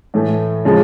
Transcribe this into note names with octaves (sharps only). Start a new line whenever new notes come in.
A2 E3 A3
C#3 F3 G#3